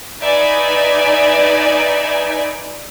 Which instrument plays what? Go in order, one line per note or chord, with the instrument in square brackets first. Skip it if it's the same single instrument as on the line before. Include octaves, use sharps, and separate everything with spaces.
[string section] D#4 B4 D5 E5 G#5